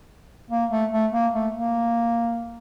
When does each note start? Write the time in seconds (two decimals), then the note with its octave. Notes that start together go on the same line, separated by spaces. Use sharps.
0.50 A#3
0.71 A3
0.92 A3
1.13 A#3
1.34 A3
1.54 A#3